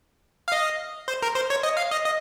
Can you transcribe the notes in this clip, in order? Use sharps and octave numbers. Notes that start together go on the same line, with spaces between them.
F5
D#5
C5
A#4
C5
C#5
D#5
F5
D#5
D#5